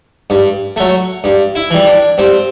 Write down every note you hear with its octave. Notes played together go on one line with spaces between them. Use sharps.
G2
F#3 A3
G2
E4
E3 G3
D4
G2 C4